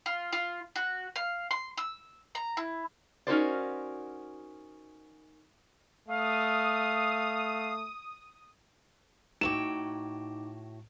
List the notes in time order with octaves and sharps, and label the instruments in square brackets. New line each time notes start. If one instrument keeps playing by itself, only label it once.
[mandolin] F4
F4
F#4
F5
C6
E6
A#5
E4
[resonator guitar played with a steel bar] C#4 D#4 F#4 A#4 C5 D5
[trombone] A3 [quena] F5 [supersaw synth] D#6
[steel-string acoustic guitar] A2 F#4 G5 [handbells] D#4 D6 [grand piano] E7